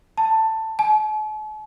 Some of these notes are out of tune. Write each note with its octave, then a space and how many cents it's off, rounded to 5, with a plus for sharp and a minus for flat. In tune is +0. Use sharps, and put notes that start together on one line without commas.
A5 +10
A5 -45